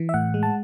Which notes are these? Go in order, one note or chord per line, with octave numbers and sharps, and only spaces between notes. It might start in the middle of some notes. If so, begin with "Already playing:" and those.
Already playing: E3
E5
A2 F#5
G#3
A5